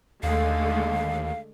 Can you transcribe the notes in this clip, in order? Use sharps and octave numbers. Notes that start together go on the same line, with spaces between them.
D#2 D3 G#3 A3 F5